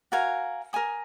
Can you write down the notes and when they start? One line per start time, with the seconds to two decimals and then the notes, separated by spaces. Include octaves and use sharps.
0.12 F#4 A#4 F5 G#5
0.73 A#4 C#5 G#5 D#6